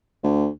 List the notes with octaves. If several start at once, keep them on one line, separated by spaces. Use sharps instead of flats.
D2